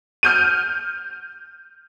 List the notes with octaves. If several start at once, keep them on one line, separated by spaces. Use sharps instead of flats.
F6 G6 D#7